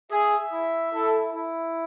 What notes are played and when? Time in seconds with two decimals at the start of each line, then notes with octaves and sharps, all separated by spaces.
0.11 G#4 E5
0.52 E4
0.93 E4 A4
1.34 E4